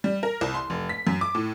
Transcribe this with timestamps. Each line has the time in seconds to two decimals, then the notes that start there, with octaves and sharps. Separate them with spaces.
0.04 G3
0.23 A#4
0.41 C2
0.54 C6
0.70 F1
0.89 B6
1.07 F#2
1.21 D6
1.35 A2